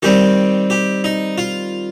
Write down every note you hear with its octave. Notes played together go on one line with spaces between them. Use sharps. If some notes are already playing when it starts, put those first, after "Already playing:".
D#3 G3 C4 G4
G4
D#4
F4